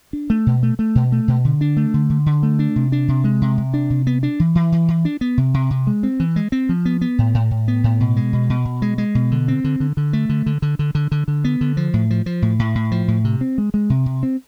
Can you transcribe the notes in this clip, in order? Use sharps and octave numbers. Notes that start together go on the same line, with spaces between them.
D4
A3
B2
A3
A3
B2
A3
B2
D3
D4
A3
D3
D3
D3
A3
D4
C3
D4
C3
G#3
C3
C3
D4
C3
B3
D4
E3
E3
E3
E3
D4
B3
C3
C3
C3
G#3
C4
E3
G#3
C4
F3
B3
B3
A2
A2
A2
B3
A2
B2
G#3
B2
B2
B2
G#3
G#3
B2
D3
C4
D3
D3
D3
A3
D3
D3
D3
D3
D3
D3
D3
B3
D3
F3
A2
F3
F3
A2
A2
A2
F3
A2
C3
C4
G#3
G#3
C3
C3
C4